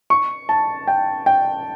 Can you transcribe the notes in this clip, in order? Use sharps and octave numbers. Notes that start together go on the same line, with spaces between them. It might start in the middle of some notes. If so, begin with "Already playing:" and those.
C#6
A5
G5
G5